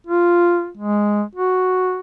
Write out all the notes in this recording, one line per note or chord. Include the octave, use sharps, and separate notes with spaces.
F4
G#3
F#4